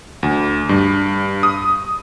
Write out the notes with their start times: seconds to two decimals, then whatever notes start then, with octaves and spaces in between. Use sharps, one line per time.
0.23 D2
0.69 G2
1.43 D#6